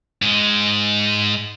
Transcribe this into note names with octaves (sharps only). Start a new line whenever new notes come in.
G#2 G#3